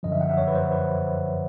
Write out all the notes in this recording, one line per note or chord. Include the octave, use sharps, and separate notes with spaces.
F#2 D3 F3 D#5
E5
F#5
E5
C#5
B4
C5
B4